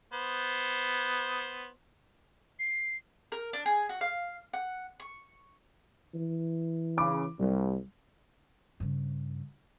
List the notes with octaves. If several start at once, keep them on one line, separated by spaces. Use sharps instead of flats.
B3 C5
C7
A#4
D4
G#4
F#4
F5
F#5
C#6
E3
C#3 B5 D6
C2 G3
G2 C#3